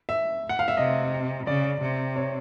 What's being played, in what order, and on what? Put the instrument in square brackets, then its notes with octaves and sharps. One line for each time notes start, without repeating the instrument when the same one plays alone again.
[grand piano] E5
F#5
F5
E5
[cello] C3 [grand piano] D#5
[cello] C#3 [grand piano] D5
[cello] C3
[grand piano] C#5